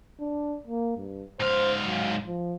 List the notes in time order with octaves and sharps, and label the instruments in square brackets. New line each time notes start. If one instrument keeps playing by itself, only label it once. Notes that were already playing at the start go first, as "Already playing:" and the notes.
[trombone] D4
A#3
G2
[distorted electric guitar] G#2 F5 [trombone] C5
[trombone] F#3
F3